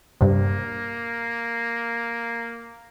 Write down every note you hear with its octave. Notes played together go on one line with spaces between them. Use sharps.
G2 C3 A#3